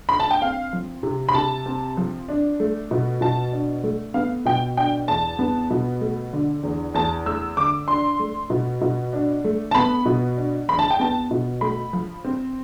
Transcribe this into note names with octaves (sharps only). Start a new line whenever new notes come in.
B5
A5
G5
C4 F5
F3
C3
B5
C3 A5
C4
F3
D4
A3
B2
B2 A5
D4
A3
B3 F5
B2 G5
D4 G5
E2 A5
B3
B2
A3
D3
E2
E2 A5
A3 E6
D3 D6
D4 C6
A3
B2
B2
D4
A3
A5
B3 B5
B2
D4
E2 B5
A5
G5
B3 A5
B2
A3 B5
F3
C4